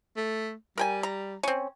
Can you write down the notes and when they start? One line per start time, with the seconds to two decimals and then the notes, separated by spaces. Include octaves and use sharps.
0.17 A3
0.78 G3 A#4 G5 G#5
1.03 A#5
1.43 C4 C#4